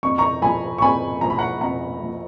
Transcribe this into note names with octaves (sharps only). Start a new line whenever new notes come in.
F2 C#6
A#5 C#6
F3 G#5 B5
C#6
F2 G#5 B5
F3 A#5
B5
F#5 A#5
F2 F#5 A#5
F3